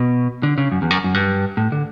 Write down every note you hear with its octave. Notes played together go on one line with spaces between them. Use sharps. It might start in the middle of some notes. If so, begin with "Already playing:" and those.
Already playing: B2
D3
C#3
F#2
E2
F#2
F#2
G2
A2
D3